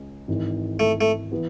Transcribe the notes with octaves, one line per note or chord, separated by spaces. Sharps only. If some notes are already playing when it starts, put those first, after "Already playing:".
Already playing: C#2 C#3 G#3 C#4
G#1 G#2 E3
A3
A3
E3 B3